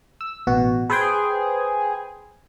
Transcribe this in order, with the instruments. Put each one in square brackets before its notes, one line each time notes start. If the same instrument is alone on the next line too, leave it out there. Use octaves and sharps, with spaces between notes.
[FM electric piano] E6
A1 B2 F#4
[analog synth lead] G#4 [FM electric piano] B4 C5 G5